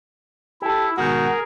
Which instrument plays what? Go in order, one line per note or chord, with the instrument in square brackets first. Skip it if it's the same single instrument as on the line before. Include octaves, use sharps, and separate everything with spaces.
[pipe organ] E4 [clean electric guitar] G4 A4
[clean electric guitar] G#2 B2 D#3 [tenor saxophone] F#4 [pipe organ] G#4 A#4